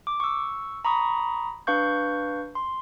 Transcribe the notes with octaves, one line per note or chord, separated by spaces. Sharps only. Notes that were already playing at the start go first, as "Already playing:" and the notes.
D6
C#6 E6
A#5 B5 C#6 D#6
D4 B4 F5 C#6 G6
C6